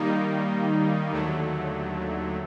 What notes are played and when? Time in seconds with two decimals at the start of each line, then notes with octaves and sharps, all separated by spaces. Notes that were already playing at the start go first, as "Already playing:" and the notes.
Already playing: D#3 G3 A#3 D#4
1.12 D#2 D3 F#3 A3